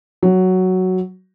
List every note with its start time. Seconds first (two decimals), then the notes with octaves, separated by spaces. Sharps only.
0.23 F#3